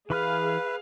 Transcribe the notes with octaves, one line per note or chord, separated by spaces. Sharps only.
E3 G#4 B4 F5 B5 F6